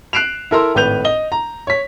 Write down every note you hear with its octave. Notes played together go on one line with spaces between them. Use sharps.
F#6 C7 D7 E7 F7
E4 A4 A#4 A#5 C6 E6
G#1 A2 B4 G6 F7
D#5 G7
A#5
C#5 B6